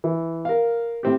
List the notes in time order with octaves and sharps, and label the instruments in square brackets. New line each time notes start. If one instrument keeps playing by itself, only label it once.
[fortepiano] E3
A#4 F5
A2 C4 G4